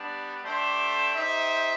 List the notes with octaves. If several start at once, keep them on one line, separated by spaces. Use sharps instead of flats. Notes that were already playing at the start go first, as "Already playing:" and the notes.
Already playing: G3 B3 D4
A3 D4 G4 C5 E5
D#4 G4 C5 E5